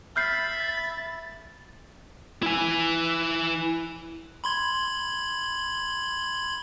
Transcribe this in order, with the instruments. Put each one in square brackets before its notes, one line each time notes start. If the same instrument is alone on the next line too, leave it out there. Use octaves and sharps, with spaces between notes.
[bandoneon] E5 B5 [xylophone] F6 G6 C7 [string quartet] A6
[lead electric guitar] E4 G#5
[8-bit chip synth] B5 C6 G#6